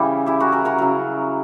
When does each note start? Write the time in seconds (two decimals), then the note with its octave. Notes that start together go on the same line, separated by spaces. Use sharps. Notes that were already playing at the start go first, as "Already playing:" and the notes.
Already playing: C#3 E3 G3 E4 G4
0.26 E4 G4
0.40 F#4 A#4
0.52 F#4 A#4
0.65 F#4 A#4
0.78 C#3 F#3